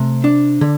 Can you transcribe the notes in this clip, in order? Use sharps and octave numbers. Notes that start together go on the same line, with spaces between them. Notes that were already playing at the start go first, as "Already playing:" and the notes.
Already playing: C3 A3
D4
D3